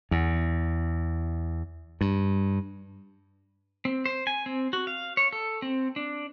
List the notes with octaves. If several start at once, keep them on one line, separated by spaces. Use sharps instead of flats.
E2
G2
C4
C5
G#5
C4
F#4
F5
C#5
A4
C4
D4